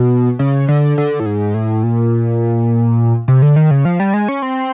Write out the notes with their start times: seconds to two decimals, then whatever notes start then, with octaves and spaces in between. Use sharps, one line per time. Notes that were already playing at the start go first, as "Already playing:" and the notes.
Already playing: B2
0.39 C#3
0.68 D3
0.98 D3
1.20 A2
1.26 G#2
1.54 A2
1.83 A#2
3.28 C3
3.42 D3
3.56 D#3
3.71 C#3
3.85 F3
4.00 G3
4.14 G#3
4.28 C#4
4.42 C4